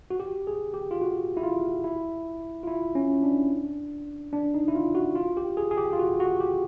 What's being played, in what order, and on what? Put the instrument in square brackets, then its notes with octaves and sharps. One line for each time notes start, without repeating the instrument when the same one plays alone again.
[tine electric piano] F#4
G4
G#4
G4
F4
F#4
E4
F4
E4
F4
E4
C#4
D4
D4
D#4
E4
F4
F#4
F4
G4
G#4
G#4
G4
F4
F#4
F#4
G4